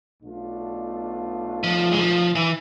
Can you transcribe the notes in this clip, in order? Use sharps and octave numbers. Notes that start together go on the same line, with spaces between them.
B1 B2 A3 D4 F4
F3
G#3
F3
E3